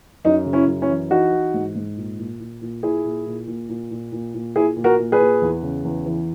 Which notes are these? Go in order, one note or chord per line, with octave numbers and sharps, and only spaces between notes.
F#2 D#4
C#3
C#4 E4
F#2
C#4 E4
E3
E3 D#4 F#4
E3
G#2
G#2
A#2
A#2
A#2
A#2
A#2 E4 G#4
A#2
A#2
A#2
A#2
A#2
A#2
A#2
A#2 E4 G#4
A#2
F#4 A#4
A#2
G#4 B4
A#2
E2
C#3
E2
E3